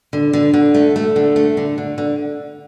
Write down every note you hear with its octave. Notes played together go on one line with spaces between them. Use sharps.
D3
D3
D3
A3
A3
D3
A3
D3
D3
D3